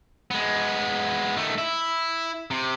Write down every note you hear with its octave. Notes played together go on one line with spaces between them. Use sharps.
G#3 B3
D#3 A3
E4
C3